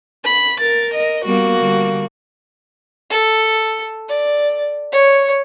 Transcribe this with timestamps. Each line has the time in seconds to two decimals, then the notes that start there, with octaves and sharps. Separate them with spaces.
0.24 B5
0.60 A#4 A6
0.94 D#5
1.25 G3 A#3 B3 F#4
1.57 D3 G3
3.10 A4
4.08 D5
4.92 C#5